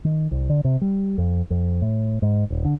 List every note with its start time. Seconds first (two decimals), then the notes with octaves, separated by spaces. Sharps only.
0.05 D#3
0.31 C2
0.50 D3
0.64 C3
0.81 G3
1.18 F2
1.50 F2
1.82 A2
2.22 G#2
2.50 D#1
2.65 D3